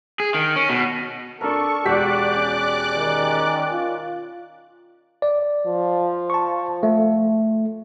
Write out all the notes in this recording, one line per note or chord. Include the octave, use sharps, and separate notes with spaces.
G#4
D#3
C#4
B2
D4 A4 A#4 C#6
E1 F#4 G4 D5 D6 F#6 B6
C#4
D#3
F4
D5
F3
A5 C#6
A3